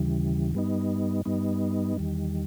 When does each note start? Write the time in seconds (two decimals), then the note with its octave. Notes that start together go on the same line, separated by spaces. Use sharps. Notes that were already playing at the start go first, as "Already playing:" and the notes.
Already playing: D#2 C#3 E3 G3
0.54 G2 G3 B3 D#4
1.25 G2 G3 B3 D#4
1.97 E2 D#3 G3